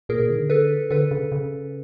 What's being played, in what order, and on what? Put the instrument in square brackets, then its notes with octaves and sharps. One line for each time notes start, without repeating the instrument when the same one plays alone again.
[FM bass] A#2 [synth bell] G#4 A#4
[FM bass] A#2
D#3
D3
[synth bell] A4 B4
[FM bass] D3 [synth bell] A4 B4
[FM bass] C#3
C#3